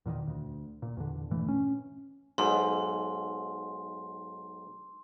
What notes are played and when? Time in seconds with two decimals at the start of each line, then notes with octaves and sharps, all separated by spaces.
0.06 E2 A#2 D3 D#3
0.27 D2
0.82 A#2
0.97 E2 D3
1.31 G2 A#2 E3 A3
1.48 C#4
2.38 B1 G#2 C6